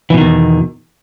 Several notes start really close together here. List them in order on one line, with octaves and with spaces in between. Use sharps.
E3 B2 D#3 E2